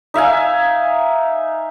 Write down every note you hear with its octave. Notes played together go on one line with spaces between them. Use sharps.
D#4 E5 F5 G#5